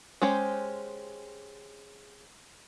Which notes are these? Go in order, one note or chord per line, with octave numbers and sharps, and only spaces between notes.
G#3 C#4 G4 C5